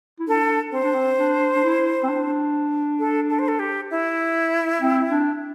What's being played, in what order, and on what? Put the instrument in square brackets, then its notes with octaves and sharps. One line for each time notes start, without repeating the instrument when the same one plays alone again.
[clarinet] E4
[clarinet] D4 [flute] A4
[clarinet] C4 [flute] C5
[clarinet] D4
C4
D4
D4
E4
C4
D4
[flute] A4
A4
C5
A4
G4
E4
[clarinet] C4
D4